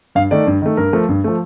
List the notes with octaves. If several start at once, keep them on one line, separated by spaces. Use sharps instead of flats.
G2 F5
D#3 A3 D5
G2
D#3 A3
G2 A#4
F3 A3
G2
F3 A3